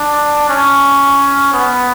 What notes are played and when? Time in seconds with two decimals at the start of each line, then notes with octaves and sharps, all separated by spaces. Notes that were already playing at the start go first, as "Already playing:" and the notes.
Already playing: D4
0.49 C#4
1.53 B3